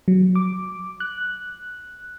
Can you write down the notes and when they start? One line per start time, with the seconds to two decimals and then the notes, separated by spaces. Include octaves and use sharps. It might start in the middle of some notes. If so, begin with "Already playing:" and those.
0.08 F#3
0.35 D6
1.00 F#6